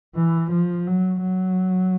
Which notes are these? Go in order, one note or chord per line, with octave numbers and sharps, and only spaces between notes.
E3
F3
F#3
F#3